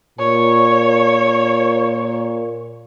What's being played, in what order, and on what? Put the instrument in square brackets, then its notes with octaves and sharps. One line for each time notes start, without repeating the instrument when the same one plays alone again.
[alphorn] A#2 [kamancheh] C#5